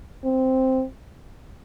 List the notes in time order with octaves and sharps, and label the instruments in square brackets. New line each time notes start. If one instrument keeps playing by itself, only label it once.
[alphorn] C4